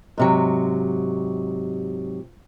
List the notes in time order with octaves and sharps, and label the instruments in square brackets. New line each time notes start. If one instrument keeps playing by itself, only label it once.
[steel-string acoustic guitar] G#2 C3 F#3